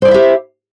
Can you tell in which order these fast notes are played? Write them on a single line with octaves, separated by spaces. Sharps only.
C5 D5 E4 E5 G4